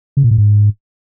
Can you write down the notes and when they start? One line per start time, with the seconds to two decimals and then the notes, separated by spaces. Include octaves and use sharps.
0.17 C#3
0.24 A#2
0.31 A2
0.38 G#2